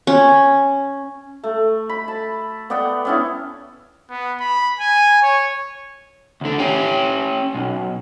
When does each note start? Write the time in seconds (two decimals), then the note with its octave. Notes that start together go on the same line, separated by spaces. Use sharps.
0.07 C#4
1.44 A3
1.89 B5
2.08 A5
2.70 B3 D5 F#5 G5
3.05 B3 C#4 E4
4.10 B3
4.40 B5
4.80 G#5
5.22 C#5
6.41 D2 D3
6.59 C#4 G4
7.54 B1